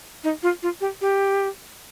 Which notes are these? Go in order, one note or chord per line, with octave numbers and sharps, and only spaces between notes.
D#4
F4
F4
G4
G4